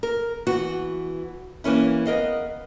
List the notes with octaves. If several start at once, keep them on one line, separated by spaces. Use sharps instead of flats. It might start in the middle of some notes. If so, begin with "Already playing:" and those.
A#4
E3 B3 F#4
E3 A#3 C#4 E4
B3 A#4 D#5 F5